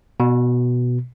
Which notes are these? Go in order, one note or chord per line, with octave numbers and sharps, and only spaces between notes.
B2